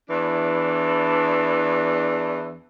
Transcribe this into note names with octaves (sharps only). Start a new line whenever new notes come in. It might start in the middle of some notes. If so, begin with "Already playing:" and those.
E2 E3 D4